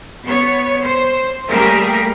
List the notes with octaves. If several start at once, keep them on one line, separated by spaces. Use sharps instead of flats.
B3 C#5
C5
G3 A3 A#3 G4 G#4 A#4